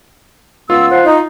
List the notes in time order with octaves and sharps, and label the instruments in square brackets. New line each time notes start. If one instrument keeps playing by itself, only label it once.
[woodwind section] C#2 B3 E6 [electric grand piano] F4
[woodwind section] C5 F5 F#5
D#4